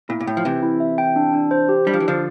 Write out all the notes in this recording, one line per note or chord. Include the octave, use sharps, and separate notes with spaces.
A#2 E4
A#2
A2 G5
F3
C3 E3 E5
E4
E5
G5
D4
D4
C5
G4
G3 D4
F3
E3
D3 F3 C5